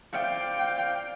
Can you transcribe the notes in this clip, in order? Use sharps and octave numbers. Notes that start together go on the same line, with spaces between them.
C4 D5 F5 G5